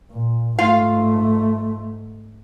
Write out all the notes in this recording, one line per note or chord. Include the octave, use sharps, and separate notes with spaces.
A#2
G#2 A3 F4 F5